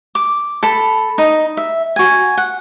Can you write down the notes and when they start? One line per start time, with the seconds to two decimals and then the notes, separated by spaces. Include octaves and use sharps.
0.15 D6
0.63 A4 B5
1.18 D#4
1.57 E5
1.96 F#4 G#5
2.37 F#5